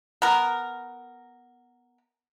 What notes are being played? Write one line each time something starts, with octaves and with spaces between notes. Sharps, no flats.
B3 A#4